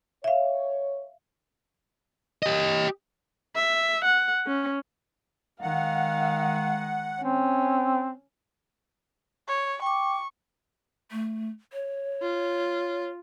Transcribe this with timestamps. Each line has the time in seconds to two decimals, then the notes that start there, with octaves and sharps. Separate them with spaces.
0.24 C#5 E5 F5
2.43 G4 D#5
3.56 E5
4.05 F#5
4.47 C#4
5.62 D#3 G#3 F5 F#5
7.21 C4 C#4
9.48 C#5
9.82 G5 C#6 D6
11.12 A3
11.73 C#5
12.22 F4